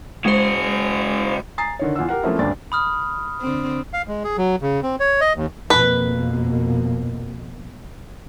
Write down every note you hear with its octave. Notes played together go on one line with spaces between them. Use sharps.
C#3 G#3 F#4 C5
G#5 A#5 D#6 A6 C7
D3 D#3 C#5
E2 F4 F#5 E6
G4 A#4 F#5
F3 A3 A#3 C4 C#4 E4
D#1 D2 G2 D4 A6
B5 D#6 F6
D3 C4
F5
G#3
G#4
F#3
C#3
C4
C#5
D#5
D#2
F2 B2 A#3 B4